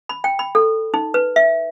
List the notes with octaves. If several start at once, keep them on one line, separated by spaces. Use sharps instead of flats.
B5
G5
B5
A4
D#4
B4
E5